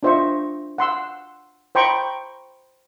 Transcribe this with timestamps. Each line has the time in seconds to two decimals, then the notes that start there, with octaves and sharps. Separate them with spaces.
0.03 D4 F4 C5 D#5 E5 C#6
0.78 F#5 C6 E6
1.75 C5 D#5 G5 A#5 B5 C#6